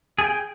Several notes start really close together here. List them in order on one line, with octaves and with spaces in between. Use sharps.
G#4 G#5 G5